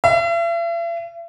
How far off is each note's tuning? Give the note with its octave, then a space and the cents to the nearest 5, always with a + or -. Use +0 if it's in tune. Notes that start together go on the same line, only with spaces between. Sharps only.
E5 +45